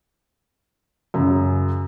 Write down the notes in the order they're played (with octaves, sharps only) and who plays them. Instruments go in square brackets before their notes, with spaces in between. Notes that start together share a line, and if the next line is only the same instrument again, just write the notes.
[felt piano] F#2 C#3